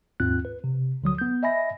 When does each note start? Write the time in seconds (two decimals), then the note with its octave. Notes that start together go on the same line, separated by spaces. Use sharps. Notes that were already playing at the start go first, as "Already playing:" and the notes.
0.20 D#2 G#2 C4 F4 F#6
0.45 B4
0.64 C3
1.02 D2 D3 F#3 D#6
1.18 B3 G6
1.43 D#5 E5 G#5 B5 A#6